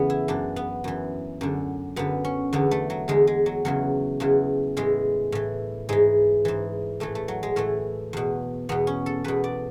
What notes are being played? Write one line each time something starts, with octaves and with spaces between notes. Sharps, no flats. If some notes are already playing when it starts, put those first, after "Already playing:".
Already playing: E2 C#3 E3 A3 B3
E4
F#2 E3 D4
B3
F#2 E3
F#2 D3
F#2 D3 B3
C#4
E2 D3 B3
A3
F#3
E2 D3 G#3
G#3
F#3
E2 C#3 E3 F#3
E2 C#3 E3
A2 E3 G#3
A2 E3
G#2 E3 G#3
G#2 E3
A2 E3 A3
A3
F#3
G#3
A2 E3 A3
E2 B2
E2 B2 B3
C#4
A4
E2 B2 B4
D5